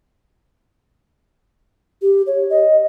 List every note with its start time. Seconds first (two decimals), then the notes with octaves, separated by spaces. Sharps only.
2.02 G4
2.27 C#5
2.50 D#5